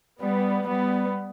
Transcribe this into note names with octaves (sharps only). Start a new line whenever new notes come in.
G3 B3
G3 B3